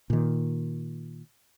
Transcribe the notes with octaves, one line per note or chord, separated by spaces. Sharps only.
A#2 D#3